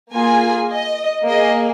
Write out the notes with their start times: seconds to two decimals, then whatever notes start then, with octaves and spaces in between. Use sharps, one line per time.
0.13 A#3 F4 G#4 G#5
0.70 D#5
1.27 A#3 G#4 D#5